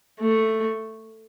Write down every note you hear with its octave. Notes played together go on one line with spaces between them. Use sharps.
A3